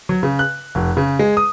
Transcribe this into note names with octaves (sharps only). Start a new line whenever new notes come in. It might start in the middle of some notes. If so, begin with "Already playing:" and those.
F#3
C#3
F#6
F1
C#3
G#3
D#6